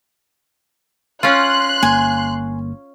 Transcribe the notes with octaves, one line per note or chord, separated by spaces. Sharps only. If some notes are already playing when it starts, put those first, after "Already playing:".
C#4 F4 C6 F#6
G1 A#3 G#5